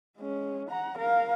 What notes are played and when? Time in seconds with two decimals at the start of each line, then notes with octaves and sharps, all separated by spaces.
0.17 G#3 C#4
0.69 F#5 A#5
0.98 A#4 F5